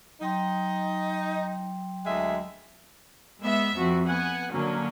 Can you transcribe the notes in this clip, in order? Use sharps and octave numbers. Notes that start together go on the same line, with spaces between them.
F#3 D#4 G5 C6
D2 G#3 E5
G#3 B3 E5
F2 F#4
B3 F#5 G#5
D3 F#3 A#3 C#4